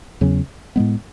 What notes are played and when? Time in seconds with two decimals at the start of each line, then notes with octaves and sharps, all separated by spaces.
0.21 E2 C#3 F#3 C#4
0.76 A2 G#3 B3